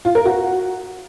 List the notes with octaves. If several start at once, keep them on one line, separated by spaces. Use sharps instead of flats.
F4
A#4
F#4